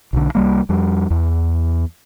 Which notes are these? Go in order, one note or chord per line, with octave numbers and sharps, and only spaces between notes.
B1 D3
C2 G3 A#3
F2 G3
E2